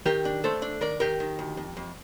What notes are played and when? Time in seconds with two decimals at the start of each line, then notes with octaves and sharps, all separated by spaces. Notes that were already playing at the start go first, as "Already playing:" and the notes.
0.06 D#3 G4 A#4
0.25 D4
0.44 A3 A4 C5
0.62 D4
0.81 D#3 A#4 D5
1.00 D#3 G4 A#4
1.20 D#3
1.39 D2
1.57 F2
1.77 F2